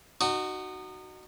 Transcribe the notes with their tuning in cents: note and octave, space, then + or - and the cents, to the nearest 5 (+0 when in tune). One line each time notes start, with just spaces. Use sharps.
D#4 -30 F#4 +10